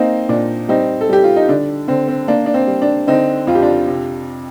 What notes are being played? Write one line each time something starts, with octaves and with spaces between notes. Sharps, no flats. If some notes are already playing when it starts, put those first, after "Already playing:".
Already playing: A#3 C4 D#4
A#2 D4
G3 C4 D#4
A4
G3 G4
F4
D#4
D3 D4
D3 C4
C4
A#3 D4
D4
C4
G3
D4
D3 C4 D#4
F2 F4
G4
D4 F4
C3